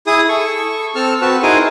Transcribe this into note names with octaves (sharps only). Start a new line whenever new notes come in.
E4 G#4 D#6
A4 C#6
C4 A4 A5 F6
C4 F#4 B4 A5
D#4 E4 G#4 A#4 C5 G#5